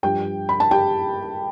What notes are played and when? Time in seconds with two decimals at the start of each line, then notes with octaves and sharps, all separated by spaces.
0.03 G2 F3 G4 G5
0.49 B5
0.60 A5
0.71 G4 G5